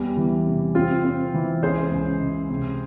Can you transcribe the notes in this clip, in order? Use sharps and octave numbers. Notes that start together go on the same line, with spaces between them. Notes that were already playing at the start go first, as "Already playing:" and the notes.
Already playing: E2 G3
E3
C3
C4 F4
C4
E3
C#2 G#4 C5
C#2
C#2
C3